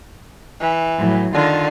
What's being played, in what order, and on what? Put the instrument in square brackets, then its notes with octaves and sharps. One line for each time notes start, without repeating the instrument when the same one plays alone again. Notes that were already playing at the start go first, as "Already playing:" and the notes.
[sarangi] E3
[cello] A2 F#3
[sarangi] D3 [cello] D#3 F4